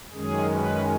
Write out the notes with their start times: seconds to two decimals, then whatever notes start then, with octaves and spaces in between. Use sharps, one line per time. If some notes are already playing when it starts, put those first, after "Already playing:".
0.13 F#2 D#3 G#3 C#4 G#4
0.51 B4